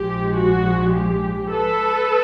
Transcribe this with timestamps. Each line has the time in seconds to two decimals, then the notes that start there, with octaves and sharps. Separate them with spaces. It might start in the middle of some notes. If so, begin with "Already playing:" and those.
Already playing: A#1 G#2 F3 G#3 G4
0.37 F#4
0.94 G4
1.51 A4 B4